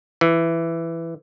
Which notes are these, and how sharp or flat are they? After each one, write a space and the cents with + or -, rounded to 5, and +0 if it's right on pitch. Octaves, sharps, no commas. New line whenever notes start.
E3 +10